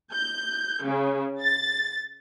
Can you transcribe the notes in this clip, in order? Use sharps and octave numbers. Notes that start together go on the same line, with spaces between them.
G6
C#3
A6